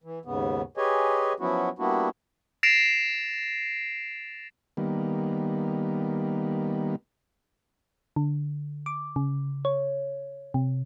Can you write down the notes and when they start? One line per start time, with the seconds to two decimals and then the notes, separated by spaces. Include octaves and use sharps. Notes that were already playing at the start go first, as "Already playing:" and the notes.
0.04 E3
0.25 D#2 G#2 C#3 B3
0.77 G4 G#4 B4 C#5 D#5 G#5
1.40 F3 F#3 B3 C#4 E4 F#4
1.79 G3 A#3 B3 D4 E4 F#4
2.63 A6 A#6 C7 D7 E7 F7
4.77 D#3 G3 A#3 B3
8.16 D3
8.86 D6
9.16 C#3
9.65 C#5
10.54 C3